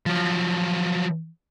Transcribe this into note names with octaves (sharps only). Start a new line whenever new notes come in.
F3 F#3